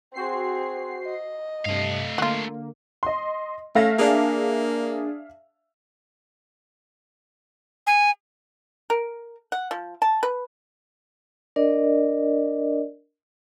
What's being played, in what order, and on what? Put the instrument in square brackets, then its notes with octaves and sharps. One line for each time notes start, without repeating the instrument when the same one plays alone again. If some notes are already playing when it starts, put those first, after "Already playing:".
[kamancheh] C4 G#4 [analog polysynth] F#4 C5 C7
[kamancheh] D#5
[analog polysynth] G2 C3 [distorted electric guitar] A3 F5
[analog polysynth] D3 A#3 [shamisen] F4 F#4
[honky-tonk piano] D#5 C6
[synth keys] A3 [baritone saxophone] C#4 [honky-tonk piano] E5 F5 A#6
[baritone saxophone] A#3 [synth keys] D4 G#4
[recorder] G#5
[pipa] A#4
F#5
F3
A5
B4
[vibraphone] D4 A#4 D5 D#5